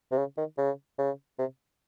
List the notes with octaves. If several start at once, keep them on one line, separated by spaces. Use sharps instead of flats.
C3
C#3
D#3
C#3
C#3
C3